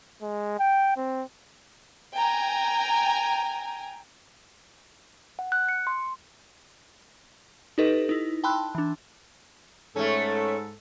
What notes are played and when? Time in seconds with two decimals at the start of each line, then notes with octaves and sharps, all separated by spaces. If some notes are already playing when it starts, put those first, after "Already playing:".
0.22 G#3
0.59 G5
0.97 C4
2.15 G5 G#5 A#5
5.39 F#5
5.52 F#6
5.69 C#7
5.87 C6
7.78 D#4 G4 A4 B4 D#5
8.09 D#4 E4
8.44 G5 A5 B5 C6 E6 F#6
8.75 E3 D4
9.96 G#2 A3 C#4 A4